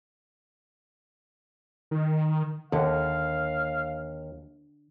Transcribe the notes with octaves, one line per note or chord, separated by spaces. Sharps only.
D#3
D#2 D3 F5